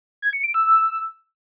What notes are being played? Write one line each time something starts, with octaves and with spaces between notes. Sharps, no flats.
G#6
C#7
D7
E6